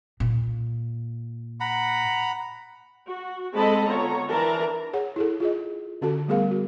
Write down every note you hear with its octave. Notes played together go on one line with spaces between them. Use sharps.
A#2
F#5 A#5 B5
F#4
G#3 C4 A4 D#5 A5 B5
D3 B3 F4 C#5 A#5
E3 D4 A#4 A5 A#5
G#4 C#5 F#5
E4 G#4 A4
F4 G#4 D#5
D3 C#4 F#4 A4 A5
G3 A3 B3 G#4 A#4 F5
F#4